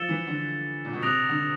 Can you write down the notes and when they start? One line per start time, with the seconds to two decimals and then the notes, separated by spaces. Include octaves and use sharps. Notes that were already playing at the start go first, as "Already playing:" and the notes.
Already playing: F3 E6 A6 C#7 E7 G7
0.09 E3
0.27 D3
0.85 A#2
0.93 B2
1.01 C3 D#6 F#6 A#6 D7 F7
1.29 D3